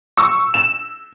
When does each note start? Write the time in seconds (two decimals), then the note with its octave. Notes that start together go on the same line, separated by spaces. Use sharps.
0.17 C#6 E6
0.54 E7